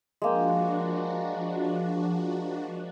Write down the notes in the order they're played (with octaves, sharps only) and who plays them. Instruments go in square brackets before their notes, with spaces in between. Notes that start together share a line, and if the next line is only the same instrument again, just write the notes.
[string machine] F3 D4 F#4 [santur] G#3 A#3 G5